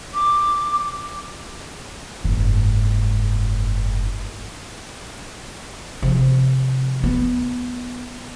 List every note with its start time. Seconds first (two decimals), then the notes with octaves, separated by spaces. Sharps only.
0.14 D6
2.25 F#1 G#2
6.02 C3 F3
7.04 B3